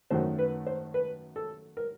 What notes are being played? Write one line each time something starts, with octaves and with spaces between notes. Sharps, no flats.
F#2 D#3 F#3 A3 C5
B4
C5
B4
A4
A#4